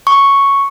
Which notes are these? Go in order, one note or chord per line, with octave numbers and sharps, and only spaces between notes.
C#6